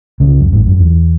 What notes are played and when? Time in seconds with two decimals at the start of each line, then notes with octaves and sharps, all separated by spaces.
0.20 C#2 C#3
0.40 F#2
0.53 G#1 G#2
0.66 F#2
0.79 E2